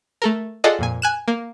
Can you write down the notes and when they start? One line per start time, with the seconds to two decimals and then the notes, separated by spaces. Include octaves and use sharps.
0.22 A3 A4 A#4
0.64 F4 G#4 A4 D5 D#5 F#5
0.79 F2 A#2 G#5
1.02 G#5 F#6 E7
1.28 A#3